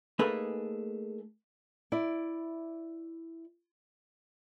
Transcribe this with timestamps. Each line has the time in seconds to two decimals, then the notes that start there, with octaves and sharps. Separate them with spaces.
0.19 A3 A#3 D#4 G#4 A4 B4
1.92 E4 D5